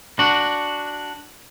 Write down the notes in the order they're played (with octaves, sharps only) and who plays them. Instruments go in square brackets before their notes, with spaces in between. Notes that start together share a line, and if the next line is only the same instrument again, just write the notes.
[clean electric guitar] D4 F#4